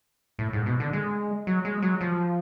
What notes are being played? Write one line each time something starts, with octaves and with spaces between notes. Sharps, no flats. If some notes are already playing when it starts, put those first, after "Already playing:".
A2
G#2
B2
D3
G#3
F#3
G#3
F#3
F3